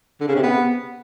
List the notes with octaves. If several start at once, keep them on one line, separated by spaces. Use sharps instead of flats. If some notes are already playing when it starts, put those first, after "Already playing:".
D3
C#3
C3
B3